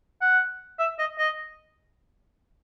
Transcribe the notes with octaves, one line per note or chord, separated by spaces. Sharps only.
F#5
E5
D#5
D#5